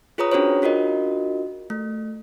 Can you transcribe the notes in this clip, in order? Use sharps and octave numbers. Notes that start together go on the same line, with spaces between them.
F4 G#4 B4 C#5 A#5 D#6
C#4 D4 F#4 G#4 C5 C#5
D4 F4 F#4 A#4 D#5
A3